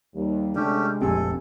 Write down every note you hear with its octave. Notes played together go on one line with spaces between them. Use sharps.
D#2 G3
C3 G#3 A3 C#4 D4 G4
F1 A#1 C4 G4 A4 G#5